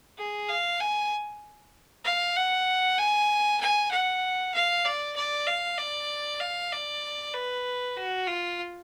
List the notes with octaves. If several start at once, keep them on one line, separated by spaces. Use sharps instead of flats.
G#4
F5
G#5
F5
F#5
G#5
G#5
F#5
F5
D5
D5
F5
D5
F5
D5
B4
F#4
F4